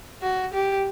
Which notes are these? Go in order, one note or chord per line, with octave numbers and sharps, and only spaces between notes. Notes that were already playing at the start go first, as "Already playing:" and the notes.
F#4
G4